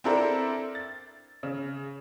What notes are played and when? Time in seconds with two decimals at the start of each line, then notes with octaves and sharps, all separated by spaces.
0.04 C4 D4 E4 A4 A#4 C5
0.75 A6
1.43 C#3